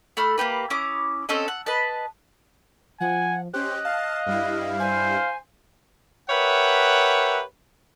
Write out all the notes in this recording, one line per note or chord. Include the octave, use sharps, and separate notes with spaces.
A3 B5 F6
A#3 B3 G4 B4
C#4 E4 D6 D#6
C4 C#4 A4 D#5
F#5
B4 D#5 A5
F3 F#5 G#5
C#4 G4 C5 D#5 F#6
F5 A5
G2 G3 E4
C5 G#5
G4 A#4 B4 C#5 E5 F#5